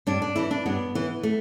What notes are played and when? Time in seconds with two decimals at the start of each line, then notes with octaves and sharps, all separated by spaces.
0.07 G2 D4
0.22 D4
0.36 E3 E4
0.51 D4
0.66 G2 B3
0.95 E3
1.23 A3